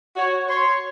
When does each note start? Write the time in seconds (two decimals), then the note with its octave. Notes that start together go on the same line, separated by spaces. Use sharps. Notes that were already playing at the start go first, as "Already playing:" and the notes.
0.16 F#4 C#5
0.49 C#5 C6